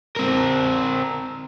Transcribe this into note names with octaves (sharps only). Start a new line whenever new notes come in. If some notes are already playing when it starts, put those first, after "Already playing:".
C4 A#4